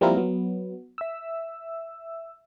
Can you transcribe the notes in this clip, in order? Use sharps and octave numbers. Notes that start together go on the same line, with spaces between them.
F3 G3 A#3 C4 E4 A#4
F#3 B3
E5 E6